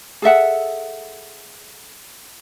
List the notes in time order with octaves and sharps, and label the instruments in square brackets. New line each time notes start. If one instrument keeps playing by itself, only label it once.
[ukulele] G#4 A4 E5 F#5